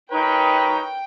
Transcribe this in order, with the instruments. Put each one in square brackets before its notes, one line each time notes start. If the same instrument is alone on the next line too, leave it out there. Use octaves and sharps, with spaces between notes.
[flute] D#4 [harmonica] A#4 C#5 [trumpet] B4 [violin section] G5